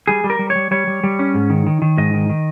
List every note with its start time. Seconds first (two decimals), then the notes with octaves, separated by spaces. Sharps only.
0.07 G3 G#4
0.24 G3
0.30 A#4
0.39 G3
0.50 C#5
0.55 G3
0.71 G3 C#5
0.87 G3
1.03 G3
1.19 C#4
1.34 G#2
1.50 D#3
1.67 D#3
1.82 D#3
1.98 G#2 D#5
2.14 D#3
2.29 D#3